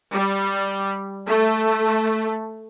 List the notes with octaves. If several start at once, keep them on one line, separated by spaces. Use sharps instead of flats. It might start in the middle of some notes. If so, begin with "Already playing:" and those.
G3
A3